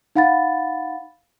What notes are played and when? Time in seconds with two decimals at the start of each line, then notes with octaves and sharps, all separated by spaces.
0.15 D#4 F5 F#5 B5 A6